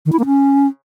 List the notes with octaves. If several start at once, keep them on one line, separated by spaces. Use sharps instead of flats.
D#3
E4
A#3
C#4